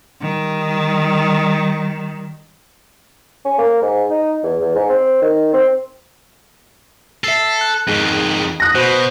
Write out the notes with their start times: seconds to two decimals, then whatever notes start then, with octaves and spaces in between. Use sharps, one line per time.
0.21 D#3 G3
3.45 C#4
3.59 A#3
3.82 G#2
4.10 D#4
4.44 E2
4.61 E2
4.76 G#2
4.89 C4
5.22 D#3
5.53 C4
7.24 A4 E5 C7
7.61 F#6
7.88 F2 G#2 D#3
8.60 D#6 F#6 A#6
8.75 B2 F#4 C5 B5